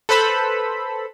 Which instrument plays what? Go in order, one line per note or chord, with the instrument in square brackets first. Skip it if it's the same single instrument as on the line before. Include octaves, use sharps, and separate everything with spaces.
[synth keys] A4 B4 C5 B5 E6